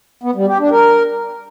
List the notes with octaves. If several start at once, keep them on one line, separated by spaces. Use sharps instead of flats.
B3
G3
G4
D4
A#4